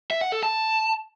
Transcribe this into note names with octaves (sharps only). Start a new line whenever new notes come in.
E5
F#5
A4
A5